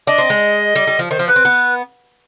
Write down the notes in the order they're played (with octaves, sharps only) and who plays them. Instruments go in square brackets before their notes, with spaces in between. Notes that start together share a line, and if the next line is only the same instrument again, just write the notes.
[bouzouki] D4 [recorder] D#5
[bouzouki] C4
G#3
G3
G3
F3
[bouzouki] D#3 [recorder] C5
[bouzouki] F3
[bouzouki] B3 [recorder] B4
[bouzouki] C4
B3